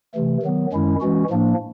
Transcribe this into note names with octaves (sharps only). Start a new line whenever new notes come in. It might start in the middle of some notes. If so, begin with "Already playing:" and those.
C3 E3 A3
D#3 F#3 B3
F#2 D#3 G#3 C#4 E4
E3 G#3 C#4 F#4
A2 F3 A#3 D4